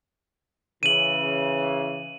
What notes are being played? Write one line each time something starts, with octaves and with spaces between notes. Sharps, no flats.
C#3 E3 D#7 F#7